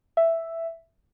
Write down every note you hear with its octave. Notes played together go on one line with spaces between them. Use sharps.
E5